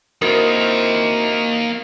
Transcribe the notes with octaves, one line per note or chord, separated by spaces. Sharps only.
A#3 C4 D#4 E4 F#4 A#4